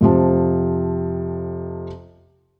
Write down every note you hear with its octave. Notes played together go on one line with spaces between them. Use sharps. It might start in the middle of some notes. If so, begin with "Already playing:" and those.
F2 C3 F3 A5